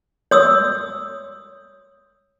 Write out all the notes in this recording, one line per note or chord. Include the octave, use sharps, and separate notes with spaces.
C#5 D#6 E6